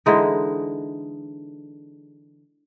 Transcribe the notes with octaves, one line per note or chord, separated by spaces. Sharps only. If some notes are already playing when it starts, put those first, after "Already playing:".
D3 E3 G#3 D#4